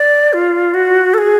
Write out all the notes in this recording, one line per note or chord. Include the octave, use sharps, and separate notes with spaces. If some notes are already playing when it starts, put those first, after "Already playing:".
Already playing: D5
F4
F#4
A4
G#4